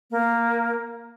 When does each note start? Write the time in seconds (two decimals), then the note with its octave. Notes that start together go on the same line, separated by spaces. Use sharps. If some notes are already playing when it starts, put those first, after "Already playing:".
0.11 A#3